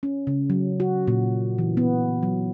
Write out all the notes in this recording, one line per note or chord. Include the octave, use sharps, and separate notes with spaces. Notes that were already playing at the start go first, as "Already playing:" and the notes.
C#4
C#3
F#3
F#4
A#2
E3
B3
F#3